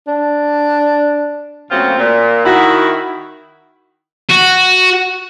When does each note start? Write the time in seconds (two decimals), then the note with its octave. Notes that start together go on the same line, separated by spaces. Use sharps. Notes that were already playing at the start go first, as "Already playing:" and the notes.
0.07 D4
1.71 A#2 C#3 F#3 A3 C4 F4
1.99 A#2
2.46 D#3 E4 F#4
4.30 F#4